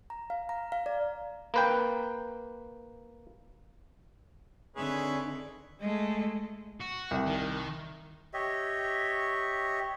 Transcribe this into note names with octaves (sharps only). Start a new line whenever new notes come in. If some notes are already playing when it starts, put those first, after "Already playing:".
A#5
F5
A#5
F5
D5
A#3 B4 G5
D3 D#3 C4 G#4 B4 C#5 E5 C#6
G#3 A3
F#4
C2
D#3
G4 C#5 D#5 E5